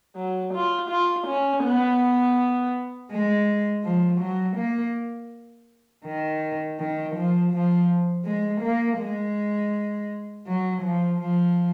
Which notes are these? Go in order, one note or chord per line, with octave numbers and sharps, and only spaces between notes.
F#3
F4
F4
C#4
B3
G#3
F3
F#3
A#3
D#3
D#3
F3
F3
G#3
A#3
G#3
F#3
F3
F3